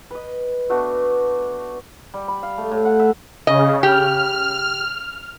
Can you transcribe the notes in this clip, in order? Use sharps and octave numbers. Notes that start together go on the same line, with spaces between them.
B4 D#5
A3 B3 D4 F#4
G3
B5
F5
A3
A2
F#5
E5
C#3 D#5
G4 F6